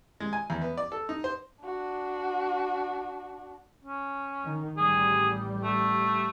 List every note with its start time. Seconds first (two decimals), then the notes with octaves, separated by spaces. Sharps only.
0.20 G#3
0.33 G#5
0.50 E2
0.61 B3
0.77 D5
0.92 A4
1.09 D#4
1.24 C5
1.64 D4 F#4
3.84 C#4
4.45 D#3
4.77 A1 G3 G#4
5.63 A3